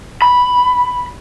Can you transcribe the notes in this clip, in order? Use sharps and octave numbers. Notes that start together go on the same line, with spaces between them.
B5